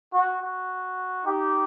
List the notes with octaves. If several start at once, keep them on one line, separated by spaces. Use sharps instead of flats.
F#4
F#4
D#4 G4